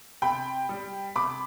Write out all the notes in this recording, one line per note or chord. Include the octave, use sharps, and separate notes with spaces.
C3 G5 B5
G3
C3 B5 D6